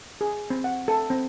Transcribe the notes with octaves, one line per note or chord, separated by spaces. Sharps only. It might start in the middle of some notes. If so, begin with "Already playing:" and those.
G#4
C4
F#5
A4
C4